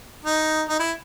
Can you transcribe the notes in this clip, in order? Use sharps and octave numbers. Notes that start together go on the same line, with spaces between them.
D#4
D#4
E4